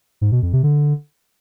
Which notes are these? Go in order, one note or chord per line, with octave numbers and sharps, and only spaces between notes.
G#2
B2
F2
C3
D3